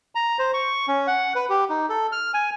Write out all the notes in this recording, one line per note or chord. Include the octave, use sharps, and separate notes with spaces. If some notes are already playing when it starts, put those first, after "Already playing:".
A#5
C5
C#6
C#4
F#5
B4
G4
D#4
A4
F6
G#5